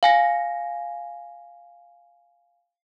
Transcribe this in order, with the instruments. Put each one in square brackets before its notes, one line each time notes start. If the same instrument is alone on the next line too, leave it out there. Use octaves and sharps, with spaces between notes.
[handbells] F5 G#5 A#6